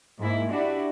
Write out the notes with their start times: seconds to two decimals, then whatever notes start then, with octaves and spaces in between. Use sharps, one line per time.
0.19 G#2 A#3 E4
0.51 D4 E4 F#4 G4